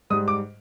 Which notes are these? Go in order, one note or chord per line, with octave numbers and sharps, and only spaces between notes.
G#2 G3 D#6
D6